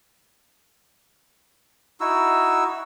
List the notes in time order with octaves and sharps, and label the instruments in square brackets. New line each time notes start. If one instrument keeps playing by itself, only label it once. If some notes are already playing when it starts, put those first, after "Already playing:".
[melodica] D#4 E4 F#4 E6